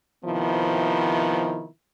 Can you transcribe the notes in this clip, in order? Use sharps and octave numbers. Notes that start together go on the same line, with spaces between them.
C3 D#3 F3 B3 E4